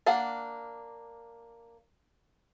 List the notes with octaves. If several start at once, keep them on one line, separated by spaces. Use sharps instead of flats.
A#3 D4 F5 F#5